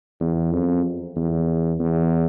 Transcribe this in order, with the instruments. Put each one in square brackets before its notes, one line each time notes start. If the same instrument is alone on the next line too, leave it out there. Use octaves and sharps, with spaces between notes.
[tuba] E2
F2
E2
E2